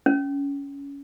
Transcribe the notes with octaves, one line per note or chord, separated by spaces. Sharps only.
C#4